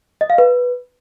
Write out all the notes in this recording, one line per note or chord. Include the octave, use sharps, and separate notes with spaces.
D#5
F5
B4